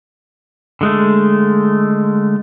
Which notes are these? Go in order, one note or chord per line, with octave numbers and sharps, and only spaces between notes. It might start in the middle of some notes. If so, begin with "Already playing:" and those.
D3 G#3 A3